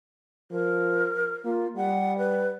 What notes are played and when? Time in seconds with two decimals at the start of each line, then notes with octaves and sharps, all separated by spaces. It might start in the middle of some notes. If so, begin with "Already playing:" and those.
0.51 F3 A#4
1.45 A#3 F4
1.76 G3 F#5
2.18 B4